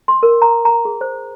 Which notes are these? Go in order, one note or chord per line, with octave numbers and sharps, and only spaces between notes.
C6
A#4
A#5
A#5
G#4
C5